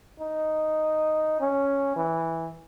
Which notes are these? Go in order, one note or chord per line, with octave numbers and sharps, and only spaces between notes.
D#4
C#4
E3